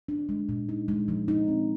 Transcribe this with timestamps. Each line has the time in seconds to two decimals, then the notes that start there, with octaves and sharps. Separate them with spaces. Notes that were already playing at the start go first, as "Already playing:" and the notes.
0.09 D4
0.29 G#3
0.49 A#2
0.69 D#4
0.88 G#3
1.08 F3
1.28 D#4
1.48 C4